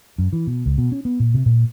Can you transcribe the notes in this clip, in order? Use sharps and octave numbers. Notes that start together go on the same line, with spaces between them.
F#2
E3
B2
C#2
B2
C#4
B3
A#2
C3
A#2